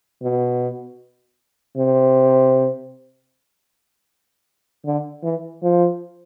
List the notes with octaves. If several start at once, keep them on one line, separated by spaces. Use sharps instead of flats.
B2
C3
D3
E3
F3